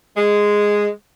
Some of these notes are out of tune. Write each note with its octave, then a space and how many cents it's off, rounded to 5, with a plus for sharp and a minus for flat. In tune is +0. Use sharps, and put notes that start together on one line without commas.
G#3 -5